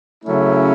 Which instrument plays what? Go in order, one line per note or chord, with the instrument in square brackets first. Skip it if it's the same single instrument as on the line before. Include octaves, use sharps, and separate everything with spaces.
[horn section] C#3 F#3 A3 C#4 E4